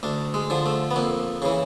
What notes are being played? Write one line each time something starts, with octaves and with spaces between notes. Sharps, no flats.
D2 D4
G#3
D3 F3
A3
B3
F2 A#3
C#3 E3